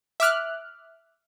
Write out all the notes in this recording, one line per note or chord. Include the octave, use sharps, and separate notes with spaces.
E5 D6 F6 F#6